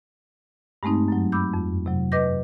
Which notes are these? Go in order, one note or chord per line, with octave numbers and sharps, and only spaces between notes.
G2 G#3 A3 C4 D#4
F#2 F#3
B5 D6 E6 G6
F2
C3 F#3
B4 D#5 D6 G6 A#6